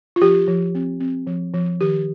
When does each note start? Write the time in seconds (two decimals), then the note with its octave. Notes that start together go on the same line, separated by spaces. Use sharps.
0.16 F4
0.21 F3 G4
0.48 F3
0.75 C4
1.00 C4
1.27 F3
1.54 F3
1.81 D#3 G4